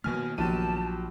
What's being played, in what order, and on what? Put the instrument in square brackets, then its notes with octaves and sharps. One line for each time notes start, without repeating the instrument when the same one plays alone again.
[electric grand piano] B2 G#5 F6 [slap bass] D#3 A#3 B3
[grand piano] A#1 [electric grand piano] F#3 G4 D#7 [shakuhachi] A5